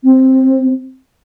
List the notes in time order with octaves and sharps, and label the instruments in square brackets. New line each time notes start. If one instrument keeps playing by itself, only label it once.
[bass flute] C4